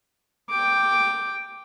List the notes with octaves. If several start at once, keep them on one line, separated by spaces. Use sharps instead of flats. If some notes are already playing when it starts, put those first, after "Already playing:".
G5 D6